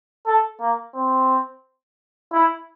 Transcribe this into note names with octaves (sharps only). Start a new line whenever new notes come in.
A4
A#3
C4
E4